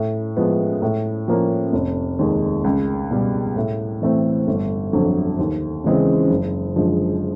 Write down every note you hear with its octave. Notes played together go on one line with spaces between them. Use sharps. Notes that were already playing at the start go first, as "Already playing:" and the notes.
Already playing: A2
F3 G#3 B3
A2
F3 A#3 C#4
F1
D#2 D#3 G#3
C#2
B2 G3
A2
E3 A3 C4
G1
F2 D3 F#3
D#2
C#3 E3 G#3 C4
F#1
F#2 D3 F3 G#3